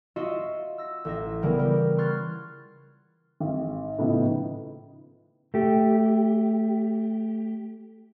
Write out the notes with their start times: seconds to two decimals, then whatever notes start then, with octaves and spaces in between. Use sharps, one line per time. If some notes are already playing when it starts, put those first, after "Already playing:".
0.16 F4 F#4 D#5 E5
0.78 E6 A#6
1.05 A1 E5 A#6
1.42 C#3 E3 G3 B3 A#4
1.59 G4 A#4
1.98 C6 C#6 F6 F#6 G#6 A6
3.40 G#1
3.98 A2 C#3 F3 B3 D#4
5.54 A3 G4